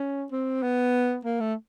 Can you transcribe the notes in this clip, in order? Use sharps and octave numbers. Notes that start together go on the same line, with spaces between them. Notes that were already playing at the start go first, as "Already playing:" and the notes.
Already playing: C#4
C4
B3
A#3
A3